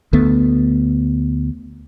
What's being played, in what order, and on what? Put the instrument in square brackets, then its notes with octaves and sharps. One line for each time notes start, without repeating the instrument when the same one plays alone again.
[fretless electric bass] D2 A3 B3